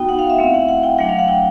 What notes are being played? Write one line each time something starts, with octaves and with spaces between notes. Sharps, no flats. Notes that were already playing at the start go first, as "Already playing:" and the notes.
Already playing: B3 D#4 F#4 G5
F#5
F5
E5
A3 C4 E4 F5
F#5
F#5
G5
F#3 A3 D4 F#5
F5
F#5
G5